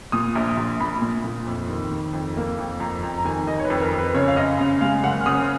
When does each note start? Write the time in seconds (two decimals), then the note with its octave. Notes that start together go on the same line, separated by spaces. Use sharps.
0.12 A#2 D#6
0.35 A#1
0.57 A#1
0.80 A#2 B5
1.02 A#2
1.24 A#2
1.46 F2
1.70 D#3
1.91 D#3
2.13 F2
2.37 A#3
2.59 F2
2.80 F2 A#5
3.03 F2 A#5
3.18 A#5
3.25 D#3 G#5
3.47 D#3 D#5
3.60 C#5
3.65 B4
3.70 F2
3.81 A#4
3.93 F2
3.98 B4
4.14 C#3 C#5
4.28 F5
4.36 F#2 D#5
4.59 C#3 F5
4.81 G#3 F5
5.03 F#1 F#5
5.21 F6
5.26 C#3 D#6